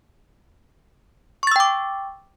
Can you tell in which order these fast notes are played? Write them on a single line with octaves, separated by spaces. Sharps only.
C#6 A6 E6 G5 D6